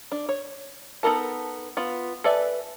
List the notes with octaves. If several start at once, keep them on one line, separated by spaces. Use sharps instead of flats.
D4
C#5
B3 D#4 A4 A#4 A5
B3 F4
A4 B4 D5 E5 G#5